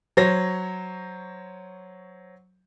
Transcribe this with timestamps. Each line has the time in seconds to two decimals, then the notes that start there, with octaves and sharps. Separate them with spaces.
0.17 F#3 C5 C#5 A#6